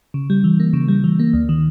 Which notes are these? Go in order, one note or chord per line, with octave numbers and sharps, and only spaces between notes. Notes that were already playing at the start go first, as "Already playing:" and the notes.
C#3
G3
E3
A#3
C#3
G3
E3
A#3
D2
D#3